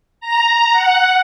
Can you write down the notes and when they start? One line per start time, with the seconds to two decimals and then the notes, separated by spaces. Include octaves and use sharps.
0.21 A#5
0.72 F#5